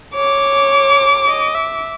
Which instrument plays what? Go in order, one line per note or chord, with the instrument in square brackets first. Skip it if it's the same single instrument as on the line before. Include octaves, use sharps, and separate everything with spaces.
[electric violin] C#5 [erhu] D6
[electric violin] D#5
E5